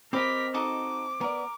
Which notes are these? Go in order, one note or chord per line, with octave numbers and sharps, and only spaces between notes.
C4 G4 A#4 C5 D#5 B5 D6 B6
D#4 F#4 A4 D6
B3 A#4 D5